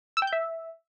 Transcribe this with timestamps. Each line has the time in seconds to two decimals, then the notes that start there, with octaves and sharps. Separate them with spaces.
0.17 E6
0.22 G5
0.27 G6
0.33 E5